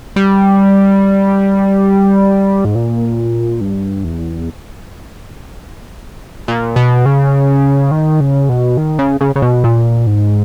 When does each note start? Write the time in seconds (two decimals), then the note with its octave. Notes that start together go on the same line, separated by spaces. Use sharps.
0.16 G3
2.65 G#2
2.75 A#2
3.61 G2
4.04 E2
6.48 A#2
6.76 B2
7.06 C#3
7.91 D#3
8.20 C#3
8.49 B2
8.77 D#3
8.99 C#3
9.21 C#3
9.36 C#3
9.42 B2
9.64 A#2
10.07 G#2